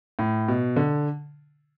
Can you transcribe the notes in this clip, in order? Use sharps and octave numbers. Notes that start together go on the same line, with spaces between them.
A2
B2
D3